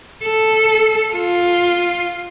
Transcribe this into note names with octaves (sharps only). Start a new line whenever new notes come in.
A4
F4